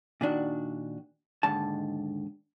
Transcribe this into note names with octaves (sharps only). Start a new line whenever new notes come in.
A#2 D#3 D4 F#4
D#2 G#2 D3 A5